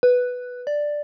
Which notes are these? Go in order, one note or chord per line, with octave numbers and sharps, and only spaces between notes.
B4
D5